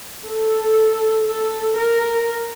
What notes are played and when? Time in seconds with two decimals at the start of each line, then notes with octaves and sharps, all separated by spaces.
0.26 A4
1.28 A4
1.77 A#4